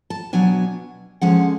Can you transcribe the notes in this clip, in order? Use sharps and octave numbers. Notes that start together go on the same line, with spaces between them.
A5
B2 F#3 B3 D4 G#5
D3 F3 G#3 C#4 F#5